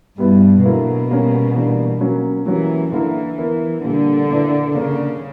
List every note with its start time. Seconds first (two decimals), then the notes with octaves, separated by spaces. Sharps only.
0.18 G2 B2 G3 B3 E4
0.63 B2 D3 F#3 A#3 E4 B4
1.10 G3 A#3 C#4
1.55 E3 G3 A#3 D4
2.00 F#3 A#3 C#4
2.46 E3 F#3 A#3 C#4 G4
2.92 D3 E3 A#3 E4 A#4
3.38 B3 E4 A#4
3.84 A#2 D3 G3 A#3
4.30 A#2 A#3 E4 B4 D5
4.75 C#3 A#3 D4 A#4 D5